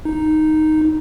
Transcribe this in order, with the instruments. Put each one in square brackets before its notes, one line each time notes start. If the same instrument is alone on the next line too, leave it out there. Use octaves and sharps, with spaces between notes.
[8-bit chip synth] D#4